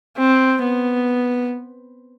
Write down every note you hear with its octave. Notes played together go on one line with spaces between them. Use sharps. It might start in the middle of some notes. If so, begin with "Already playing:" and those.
C4
B3